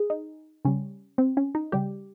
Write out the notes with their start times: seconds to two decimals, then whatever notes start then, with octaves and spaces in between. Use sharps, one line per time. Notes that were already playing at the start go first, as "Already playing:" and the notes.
Already playing: G#4
0.10 D#4
0.65 C#3 G3 C#4
1.18 C4
1.37 C#4
1.55 D#4
1.72 C#3 G3 G4